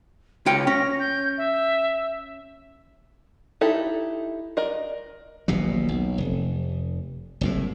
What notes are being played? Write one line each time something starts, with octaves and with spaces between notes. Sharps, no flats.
C#2 F4 G5 C#7
C#4 A#6
G6
E5
D#4 E4 G4 A4
A#4 D5 D#5
D#1 A#1 B2 F#3
B1
F1
F#1 C2 A2